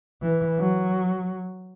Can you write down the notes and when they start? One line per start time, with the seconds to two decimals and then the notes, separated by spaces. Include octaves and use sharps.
0.22 E3
0.59 F#3